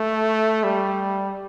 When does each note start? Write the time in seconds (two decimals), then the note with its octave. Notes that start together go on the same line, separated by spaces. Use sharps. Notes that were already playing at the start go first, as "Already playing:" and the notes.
Already playing: A3
0.64 G3